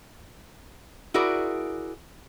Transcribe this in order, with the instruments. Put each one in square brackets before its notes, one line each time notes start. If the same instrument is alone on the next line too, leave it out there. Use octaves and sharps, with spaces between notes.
[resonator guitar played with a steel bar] E4 F#4 G#4 A#4 D5